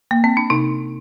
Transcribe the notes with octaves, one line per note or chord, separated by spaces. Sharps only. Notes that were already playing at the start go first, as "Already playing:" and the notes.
A#3
C4
D4
C3 D#4